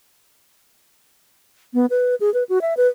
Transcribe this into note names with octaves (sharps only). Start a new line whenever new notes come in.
B3
B4
G#4
B4
F#4
E5
B4